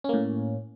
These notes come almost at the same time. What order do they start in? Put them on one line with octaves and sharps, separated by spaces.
C#4 A#3 A2